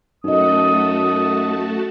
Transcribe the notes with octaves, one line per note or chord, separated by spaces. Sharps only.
F#2 A3 D#4 F#4 A4 D#5 D#6